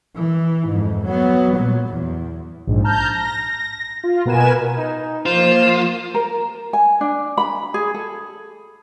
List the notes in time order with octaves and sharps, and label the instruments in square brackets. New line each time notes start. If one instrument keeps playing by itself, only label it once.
[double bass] E3
F2 G#2
F#3 B3
A#2 F#3
E2
[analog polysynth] A#1 G#2
A5 A#5 F6 G6
A#6
F4
B2 B3 A#4 B4 G#5 E7
[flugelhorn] D#4
[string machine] F3 A#3 [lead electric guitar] F4 [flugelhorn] C5 [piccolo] E7
[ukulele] A#4
G#5
D4
B5
G#4
A4